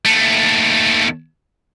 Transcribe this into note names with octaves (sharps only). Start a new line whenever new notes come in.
D#2 A3